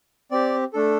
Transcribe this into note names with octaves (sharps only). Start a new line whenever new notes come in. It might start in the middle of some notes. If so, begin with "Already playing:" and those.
C4 G4 D5
A3 D4 A4